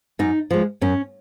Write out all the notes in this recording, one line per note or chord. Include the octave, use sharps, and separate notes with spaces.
F#2 D#4
F3 G#3
F#2 C#4